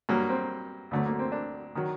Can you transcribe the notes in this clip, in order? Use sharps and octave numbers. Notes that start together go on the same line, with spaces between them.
G2 F#3 A#3
C4
D2 D3 F#3 A3
A#3
C4
D4
D#3 F#3